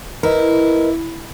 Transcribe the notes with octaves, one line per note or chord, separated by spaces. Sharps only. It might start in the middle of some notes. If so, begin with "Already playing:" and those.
E4 A#4 B4 D#5